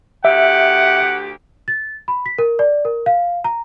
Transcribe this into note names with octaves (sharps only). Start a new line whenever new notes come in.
D2 G4 E5 F#5
A6
B5
B6
A#4
D5
A#4
F5
A#5